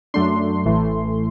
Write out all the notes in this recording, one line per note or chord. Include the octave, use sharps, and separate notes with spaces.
F#2 F#3 A3 D4 C6
A1 A2 E3 A3